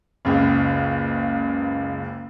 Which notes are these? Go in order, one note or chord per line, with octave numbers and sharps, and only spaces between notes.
F#1 C#2